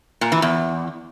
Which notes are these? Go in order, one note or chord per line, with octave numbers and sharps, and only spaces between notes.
A#2
E3
E2